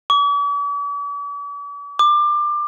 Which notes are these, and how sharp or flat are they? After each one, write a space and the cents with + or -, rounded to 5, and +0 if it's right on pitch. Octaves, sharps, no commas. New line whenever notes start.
D6 -45
D6 +25